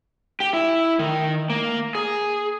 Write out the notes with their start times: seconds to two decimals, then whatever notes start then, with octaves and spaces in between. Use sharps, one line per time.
0.40 G4
0.53 E4
0.99 D#3
1.50 A#3
1.95 G#4